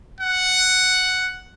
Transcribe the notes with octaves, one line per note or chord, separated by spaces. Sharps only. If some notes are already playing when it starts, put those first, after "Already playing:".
F#5